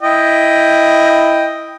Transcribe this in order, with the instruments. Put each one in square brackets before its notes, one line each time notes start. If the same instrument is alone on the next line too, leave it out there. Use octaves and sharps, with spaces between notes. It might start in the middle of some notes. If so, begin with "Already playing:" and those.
[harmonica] E4 D#5 G5